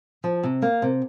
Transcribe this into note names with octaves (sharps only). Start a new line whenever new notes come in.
F3
C3
A#3
C3